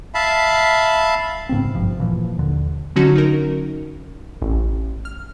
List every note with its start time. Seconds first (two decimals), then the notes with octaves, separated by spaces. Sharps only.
0.15 E5 F5 A5 B5
1.49 G#2 C#3 B3 C4
1.75 G#1 G2 C3 F3
2.00 A#2 E3 F3
2.38 D#2 D3
2.96 D3 F#3 C#4 D#4 F#4
3.16 D#4 A#4
4.42 A1
5.05 F6